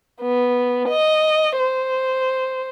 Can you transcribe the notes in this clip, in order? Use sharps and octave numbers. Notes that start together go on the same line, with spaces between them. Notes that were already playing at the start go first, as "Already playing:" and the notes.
B3
D#5
C5